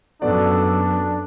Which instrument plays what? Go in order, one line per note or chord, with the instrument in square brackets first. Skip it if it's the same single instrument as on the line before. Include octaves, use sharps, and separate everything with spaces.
[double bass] F#2 [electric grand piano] B3 F#4 D5 [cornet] D4 [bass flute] A4